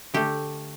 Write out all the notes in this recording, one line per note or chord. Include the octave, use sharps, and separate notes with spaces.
D3 A3 G4